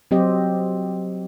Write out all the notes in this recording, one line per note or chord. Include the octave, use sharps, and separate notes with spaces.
F#3 C4 G4 D#5